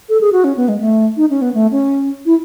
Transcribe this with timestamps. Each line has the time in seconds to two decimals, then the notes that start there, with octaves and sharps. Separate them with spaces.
0.09 A4
0.21 G#4
0.33 F#4
0.44 C#4
0.57 B3
0.69 G#3
0.81 A3
1.17 D#4
1.30 C#4
1.42 B3
1.54 A3
1.71 C#4
2.26 E4